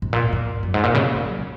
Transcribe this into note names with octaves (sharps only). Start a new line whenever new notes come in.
G#2
A#2
G#2
F#2
G#2
A#2
C#3
G#3
F#3